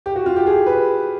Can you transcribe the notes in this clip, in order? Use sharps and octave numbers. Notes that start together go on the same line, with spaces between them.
G4
F#4
F4
G4
G#4
B4